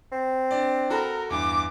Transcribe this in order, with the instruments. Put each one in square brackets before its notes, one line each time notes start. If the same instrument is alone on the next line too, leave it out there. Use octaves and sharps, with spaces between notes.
[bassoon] C4
[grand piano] D4 D5
[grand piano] F#4 A4 B5 [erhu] A#4
[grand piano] E2 G2 [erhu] D6